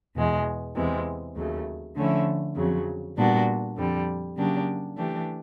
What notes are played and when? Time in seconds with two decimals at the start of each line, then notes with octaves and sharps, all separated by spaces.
0.15 E2 B2 G#3
0.75 E2 C3 E3 G#3
1.36 D#2 C#3 F#3 A3
1.96 D3 F3 A3 C#4 E4
2.56 F2 C#3 F#3
3.17 A#2 G3 B3 D4 F#4
3.76 F2 D3 G3
4.37 C#3 F#3 A#3 D4 G4
4.97 E3 A3 D4 G4